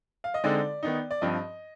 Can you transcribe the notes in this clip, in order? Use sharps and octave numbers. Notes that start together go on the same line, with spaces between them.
F5
D#5
D3 G#3 C4 D#4 D5
D#3 B3 D#4
D5
G2 F3 C4 D#5